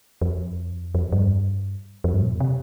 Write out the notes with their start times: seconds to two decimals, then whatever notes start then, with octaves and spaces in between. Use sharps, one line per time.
0.22 F2
0.95 F2
1.12 G2
2.04 F2
2.13 G2
2.22 A#2
2.40 C3